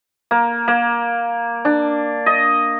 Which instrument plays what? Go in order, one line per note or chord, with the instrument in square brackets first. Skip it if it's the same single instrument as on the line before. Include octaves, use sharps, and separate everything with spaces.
[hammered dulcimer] A#3
A#3
D4
D#5